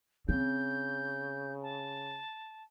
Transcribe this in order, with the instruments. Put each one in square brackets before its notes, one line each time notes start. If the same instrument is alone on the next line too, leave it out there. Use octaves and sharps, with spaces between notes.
[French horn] C#3 [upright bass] C4 [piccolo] G6
[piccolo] A5